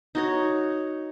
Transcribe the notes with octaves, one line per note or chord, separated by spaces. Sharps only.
D#4 F#4 C#5